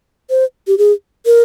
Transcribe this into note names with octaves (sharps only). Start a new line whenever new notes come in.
C5
G4
G#4
A#4